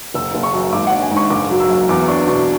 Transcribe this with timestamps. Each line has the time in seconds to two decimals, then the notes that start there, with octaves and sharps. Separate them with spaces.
0.14 F#1 E6
0.34 F#1
0.43 C#6
0.54 F#2
0.73 G#1 D6
0.87 D4 F#5
1.02 G#5
1.11 G#2
1.17 C#6
1.30 F#1 D6
1.51 F#3
1.60 E6
1.69 F#2
1.89 E2 D6
2.08 D4 C#6
2.27 B2 C#6